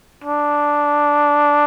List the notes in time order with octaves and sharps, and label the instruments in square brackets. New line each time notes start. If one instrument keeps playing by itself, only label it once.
[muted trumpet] D4